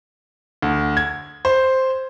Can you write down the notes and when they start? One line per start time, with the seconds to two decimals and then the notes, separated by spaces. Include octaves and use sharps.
0.62 D2
0.97 G#6
1.45 C5